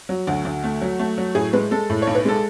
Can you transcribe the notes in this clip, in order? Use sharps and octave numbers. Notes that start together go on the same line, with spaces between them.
F#3
D2 F#4
D2
A3
F#3
A3
F#3
A2 G#4
G#3 B4
G#3 A4
A2
B1 C#5
B4
G#3 A4